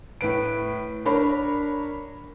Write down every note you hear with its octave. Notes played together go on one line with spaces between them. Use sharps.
A2 B4 D7
D4 A#4 C#5 B5